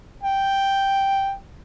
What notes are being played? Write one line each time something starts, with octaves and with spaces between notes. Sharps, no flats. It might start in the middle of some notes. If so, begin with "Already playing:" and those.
G5